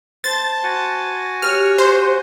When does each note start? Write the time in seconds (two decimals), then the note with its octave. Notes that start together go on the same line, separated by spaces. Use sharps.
0.24 C5 A5 A6
0.64 F#4 F#5 G#5
1.42 G4 C#5 F6
1.78 C5